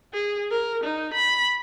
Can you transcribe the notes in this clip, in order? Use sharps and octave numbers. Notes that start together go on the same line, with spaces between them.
G#4
A#4
D#4
B5